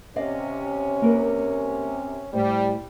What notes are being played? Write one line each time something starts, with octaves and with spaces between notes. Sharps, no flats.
C3 C#4 D5 D#5 F5
A#3 A#4 B4
A2 G3 C5